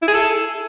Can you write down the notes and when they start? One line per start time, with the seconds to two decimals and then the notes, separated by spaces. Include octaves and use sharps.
0.02 E4
0.08 G#4
0.14 A4